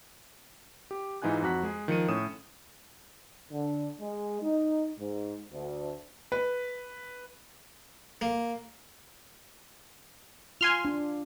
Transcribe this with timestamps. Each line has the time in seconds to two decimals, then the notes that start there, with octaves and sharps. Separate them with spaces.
0.91 G4
1.22 G#2 E3 D#4 F4 G#5 F#6
1.42 F2 F#4 A#5 F#6 B6
1.63 G#3 G#4
1.88 D#3 F3 C#7 D#7
2.08 A2 C#4 D#6 E7
3.51 D3
4.00 G#3
4.42 D#4
4.98 G#2
5.52 D2
6.32 B4
8.21 A#3
10.61 F4 G#5 C6 F6
10.85 D4